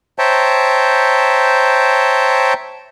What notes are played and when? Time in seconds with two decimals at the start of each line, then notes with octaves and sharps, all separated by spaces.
0.19 C5 C#5 E5 G5 A5 A#5